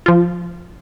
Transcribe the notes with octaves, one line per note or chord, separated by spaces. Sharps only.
F3 F4